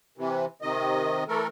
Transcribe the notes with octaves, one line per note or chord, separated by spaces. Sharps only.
C3 E3
C3 D#3 D#5
E3 A3 A4 A#4